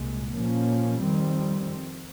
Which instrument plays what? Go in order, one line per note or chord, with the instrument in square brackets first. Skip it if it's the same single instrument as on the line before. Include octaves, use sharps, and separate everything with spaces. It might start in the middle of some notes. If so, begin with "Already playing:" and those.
Already playing: [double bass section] C2 A#2 G#3
A#2 F3 A#3 C#4
F2 D#3 G3 C4